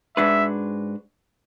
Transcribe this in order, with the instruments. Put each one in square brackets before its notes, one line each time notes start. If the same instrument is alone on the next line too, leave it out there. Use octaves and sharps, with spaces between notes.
[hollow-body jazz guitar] G#2 G#3 D4 F#4 B4 [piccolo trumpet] E5